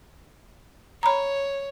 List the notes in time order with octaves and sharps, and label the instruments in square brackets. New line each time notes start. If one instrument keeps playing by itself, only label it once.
[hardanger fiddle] C#5 [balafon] A#5 B5